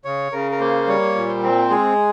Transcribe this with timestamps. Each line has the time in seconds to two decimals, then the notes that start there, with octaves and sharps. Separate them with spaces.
0.05 C#3 C#5
0.32 C#3 A#4
0.51 A#4
0.60 A#3 C5
0.88 G3 C#5
1.16 A#2
1.28 C5
1.43 C4
1.70 G#3 G#4